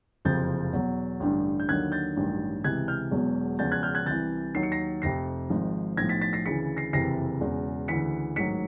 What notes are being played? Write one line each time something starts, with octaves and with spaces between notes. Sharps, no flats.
F#1 F2 C3 F3 G6 A6
E2 B2 F#3
A1 G2 D3
G6
D#2 D3 F#3 F#6 G#6
G6 A6
A1 G2 D#3 F#3
C#2 C3 E3 F#6 G#6
F6 G6
E1 E2 B2 F#3
E1 E2 C#3 F3 G6 A6
F#6 G#6
F6 G6
F#6 G#6
C2 C3 E3 G6 A6
D#2 D#3 F#3 C7
C#7
A#6 C7
F1 F2 C3 A#6 C7
G#1 G#2 F3
B1 A2 F3 G#6 A#6
A6 B6
A6 B6
A#6 C7
D2 C#3 E3 B6 C#7
A#6 C7
F#1 F2 C3 E3 A#6 C7
E1 E2 C#3
D2 C#3 E3 B6 C#7
A1 G#2 D#3 F#3 B6 C#7